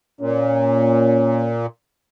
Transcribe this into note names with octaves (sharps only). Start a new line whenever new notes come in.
A#2 C#4